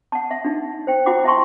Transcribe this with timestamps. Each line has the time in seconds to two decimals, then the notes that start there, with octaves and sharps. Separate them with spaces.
0.12 F#5 A5
0.31 E5
0.45 D4 D#4
0.87 C5 G5
1.06 E4 F4 C5 F#5 D6
1.24 E4 E5 G5 A5 C6 C#6